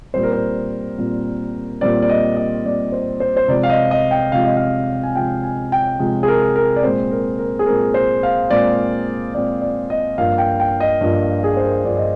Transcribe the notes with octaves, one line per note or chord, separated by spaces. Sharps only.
A#2 G3 C4 C5
A#4
C5
A#2 G3 C4
A#2 G3 C4 D5
D5
D#5
D#5
A#2 G3 C4 D5
C5
C5
C5
C3 F3 G#3 D5
F5
D#5
D#5
G5
C3 F3 G#3 F5
D#5
F5
G#5
C3 F3 G#3 G5
G#5
G5
C3 F3 G#3
G#4
A#4
A#4
D5
A#2 G#3 C4 C5
A#4
A#4
G#4
A#2 G#3 C4 A#4
C5
F5
A#2 G#3 C4 D5
A#2 G#3 C4 D5
D5
D#5
G2 F3 A#3 F5
G5
G5
D#5
G2 F3 A#3
G#4
C5
A#4
G2 F3 A#3 D5
D#5